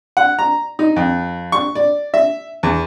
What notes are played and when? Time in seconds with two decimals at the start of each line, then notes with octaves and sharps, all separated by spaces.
0.17 F#5
0.39 A#5
0.79 D#4
0.96 F2
1.52 C#6
1.75 D5
2.14 E5
2.63 E2